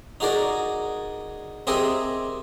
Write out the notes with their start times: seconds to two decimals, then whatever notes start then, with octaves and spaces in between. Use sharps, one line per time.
0.20 D#4 F#4 G#4 A#4 D5
1.67 C4 G4 G#4 A#4 D#5 E5